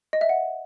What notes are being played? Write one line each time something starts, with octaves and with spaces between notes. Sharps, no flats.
D#5
E5
F#5